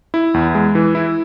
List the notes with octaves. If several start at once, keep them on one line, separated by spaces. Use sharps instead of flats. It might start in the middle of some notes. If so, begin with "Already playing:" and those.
E4
E2
G#3
E3
E4